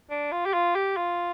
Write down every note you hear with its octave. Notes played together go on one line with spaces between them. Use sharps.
D4
F4
G4
F4
G4
F4